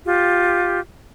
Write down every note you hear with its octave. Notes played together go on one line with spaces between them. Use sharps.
F4 G4